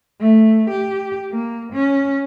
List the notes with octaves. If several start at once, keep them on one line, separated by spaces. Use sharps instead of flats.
A3
G4
A#3
C#4